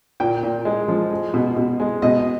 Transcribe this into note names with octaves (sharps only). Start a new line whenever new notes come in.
A#2 G5
A#2
G#3
F3
G#3
B2
B2
G#3
B2 D#5